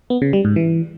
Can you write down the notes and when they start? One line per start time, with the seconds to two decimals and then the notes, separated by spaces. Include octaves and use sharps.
0.10 B3
0.22 C#3
0.33 G3
0.45 G#2
0.56 E3